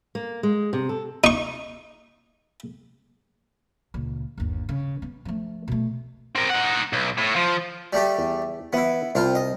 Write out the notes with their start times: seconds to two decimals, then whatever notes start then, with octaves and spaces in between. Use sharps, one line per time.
0.15 A#3
0.43 G#3
0.73 C3
0.89 A4
1.24 D#4 C#6
3.94 C#2 A#2
4.38 G1 D#2
4.69 C#3
5.02 B3
5.25 F3 A3
5.68 B2 A3
6.36 C4 A#4
6.50 D#4 F#5
6.93 B1
7.18 A2
7.36 F3
7.93 G3 A3 G4
8.18 E2
8.73 E3 B3 E4 B4 E5
9.15 C2 C4 F4 C5
9.35 D#5